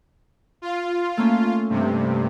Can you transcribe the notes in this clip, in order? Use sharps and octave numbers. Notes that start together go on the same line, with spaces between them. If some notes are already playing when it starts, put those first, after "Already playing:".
F4
A3 A#3 C#4
G2 C3